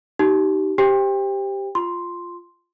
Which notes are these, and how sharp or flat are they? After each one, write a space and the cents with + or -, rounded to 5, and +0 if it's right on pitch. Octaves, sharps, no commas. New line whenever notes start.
D#4 +0 G4 -30
G4 +0 C5 +0 G5 +30
F4 +0 C6 +0